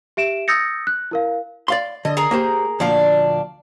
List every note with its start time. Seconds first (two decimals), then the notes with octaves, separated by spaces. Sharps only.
0.17 G4 E5 D7 E7
0.48 D#6 E6 G6 A6 A#6 C#7
0.87 F#6
1.11 E4 A#4 F5
1.68 D5 F5 C6
2.05 D3 D#5
2.17 G#4 A#4 A#5
2.31 A#3 G4 C5
2.80 D2 A#2 F3 D4 F5